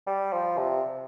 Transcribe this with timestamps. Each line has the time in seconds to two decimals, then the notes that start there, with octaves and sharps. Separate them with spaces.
0.07 G3
0.32 F3
0.58 C3